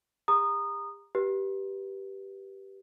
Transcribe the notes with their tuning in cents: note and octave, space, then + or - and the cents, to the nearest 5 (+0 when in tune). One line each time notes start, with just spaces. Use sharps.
G4 +45 A#5 +0 D#6 -20
G4 -10 B4 -20